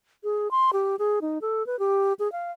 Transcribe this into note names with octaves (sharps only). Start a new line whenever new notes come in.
G#4
C6
G4
G#4
D#4
A4
B4
G4
G#4
F5